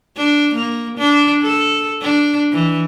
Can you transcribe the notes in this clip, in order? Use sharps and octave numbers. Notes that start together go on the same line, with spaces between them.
D4
A#3
D4
A4
D4
E3